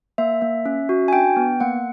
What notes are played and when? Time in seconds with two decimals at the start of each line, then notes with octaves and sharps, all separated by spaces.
0.18 A#3 E5
0.42 A#3
0.66 C#4
0.89 F#4
1.08 G#5
1.13 D4 G5
1.37 B3
1.60 A#3 F#5